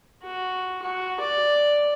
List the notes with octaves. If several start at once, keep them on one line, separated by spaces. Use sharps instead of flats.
F#4
F#4
D5